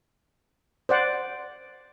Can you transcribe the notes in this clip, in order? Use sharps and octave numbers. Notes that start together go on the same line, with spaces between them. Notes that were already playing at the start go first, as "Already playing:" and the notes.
C5 D5 F#5